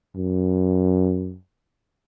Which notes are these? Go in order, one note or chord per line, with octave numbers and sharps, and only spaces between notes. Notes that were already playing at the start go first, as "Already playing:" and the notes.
F#2